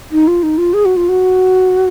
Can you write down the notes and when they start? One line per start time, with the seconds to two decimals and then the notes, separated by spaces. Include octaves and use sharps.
0.12 D#4
0.27 F4
0.43 D#4
0.58 F4
0.73 G#4
0.85 F#4
0.97 F4
1.09 F#4